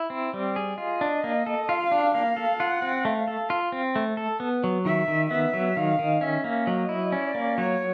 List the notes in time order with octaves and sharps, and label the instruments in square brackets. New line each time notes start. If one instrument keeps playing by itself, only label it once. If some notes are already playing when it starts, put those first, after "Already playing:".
Already playing: [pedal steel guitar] E4
C4
G3
G#4
[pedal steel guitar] F4 [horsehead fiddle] D#5
[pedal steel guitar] D4
A#3
A4
[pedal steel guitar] F4 [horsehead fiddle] F5
[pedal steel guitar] D4
[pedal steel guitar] A#3 [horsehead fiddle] F5
[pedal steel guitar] A4
[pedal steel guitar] F4 [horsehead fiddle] F#5
[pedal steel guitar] C4
[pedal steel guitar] A3 [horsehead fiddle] F5
[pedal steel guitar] A4
F4
C4
A3
A4
B3
F#3
[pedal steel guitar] D#3 [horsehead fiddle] E5
[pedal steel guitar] D#3
[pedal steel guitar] B3 [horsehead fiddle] E5
[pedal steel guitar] F#3
[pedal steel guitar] D#3 [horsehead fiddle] F5
[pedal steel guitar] D#3
[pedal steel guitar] C#4 [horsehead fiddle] E5
[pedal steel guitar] A#3
[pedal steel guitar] F#3 [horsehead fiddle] D#5
[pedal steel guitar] E4
[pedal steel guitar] C#4 [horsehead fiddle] D5
[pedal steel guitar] A#3
[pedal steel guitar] F#3 [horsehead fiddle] C#5